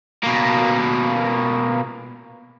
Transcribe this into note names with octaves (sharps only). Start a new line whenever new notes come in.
B2 A#3